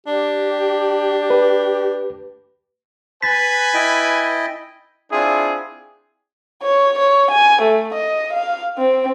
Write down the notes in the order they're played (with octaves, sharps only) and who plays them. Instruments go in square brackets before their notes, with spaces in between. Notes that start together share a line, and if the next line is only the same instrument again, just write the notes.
[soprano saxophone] D4 [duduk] G4
[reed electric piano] B4
[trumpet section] B4 G#5 [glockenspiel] A6 B6
[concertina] E4 D#5 G5
[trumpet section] C4 D4 E4 F4 G#4
[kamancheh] C#5
C#5
G#5
A3
D#5
F5
C4